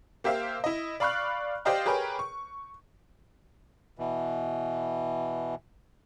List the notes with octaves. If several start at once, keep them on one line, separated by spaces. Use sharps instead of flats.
A#3 G4 C5 E5 F5
E4 D#5
D5 F5 B5 C#6 F6 F#6
G4 C5 D5 D#5 F5 G5
G4 G#4 A#4 B4 C#5 G5
C#6
B2 E3